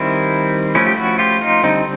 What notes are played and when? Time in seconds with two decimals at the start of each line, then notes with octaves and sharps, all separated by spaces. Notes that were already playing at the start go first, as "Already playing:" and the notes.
Already playing: D#3 G3 C4 E4
0.75 F3 A3 C#4 E4
0.87 G4
0.96 E4 F#4
1.19 F4 G4
1.41 D#4 F4
1.63 D3 G3 C4 D#4